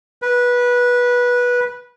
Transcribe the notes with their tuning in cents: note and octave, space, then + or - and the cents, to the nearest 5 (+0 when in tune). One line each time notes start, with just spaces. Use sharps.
B4 -15